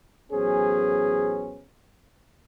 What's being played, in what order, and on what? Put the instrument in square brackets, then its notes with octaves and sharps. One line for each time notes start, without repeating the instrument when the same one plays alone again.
[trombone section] A1 F#3 B3 C#4 G#4 C5